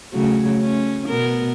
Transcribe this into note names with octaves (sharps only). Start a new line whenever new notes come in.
C#3 F#3 A3
A3 C#4
B2 B3 A#4